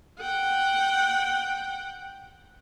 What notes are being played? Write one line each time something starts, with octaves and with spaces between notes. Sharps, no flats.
F#5 G5